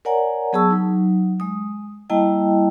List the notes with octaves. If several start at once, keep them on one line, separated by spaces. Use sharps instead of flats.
A#4 C#5 D5 F#5 G#5 A#5
F#3 B3 G#4 A5 C#6 E6
F#3 D#4
G#3 D#6
G3 A#3 E4 D#5 G5 A5